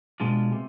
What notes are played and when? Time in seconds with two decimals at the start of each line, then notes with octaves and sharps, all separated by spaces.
0.20 B2 G#3 D4 F4
0.52 C3